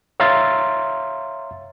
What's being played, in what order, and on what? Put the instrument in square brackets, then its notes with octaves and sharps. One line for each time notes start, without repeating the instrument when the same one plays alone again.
[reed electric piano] C#5 E5 F5 A#5 C6 A6